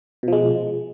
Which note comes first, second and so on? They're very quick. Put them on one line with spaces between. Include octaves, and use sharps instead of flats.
B2 F3 G#3